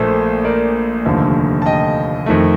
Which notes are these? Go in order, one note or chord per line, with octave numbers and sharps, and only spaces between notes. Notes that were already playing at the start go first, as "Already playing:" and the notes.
Already playing: A#1 A#2 A3 A4 C5
A#4 D5
F1 D#2 D3 F3 A3
A5
D#5 G5
F2 D#3 A3